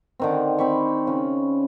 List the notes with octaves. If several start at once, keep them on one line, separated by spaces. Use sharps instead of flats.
D3 D#3 C4
C4 B5 C#6
C#3 C#4